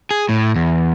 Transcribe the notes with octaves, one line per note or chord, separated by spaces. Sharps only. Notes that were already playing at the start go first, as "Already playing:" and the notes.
G#4
A2
E2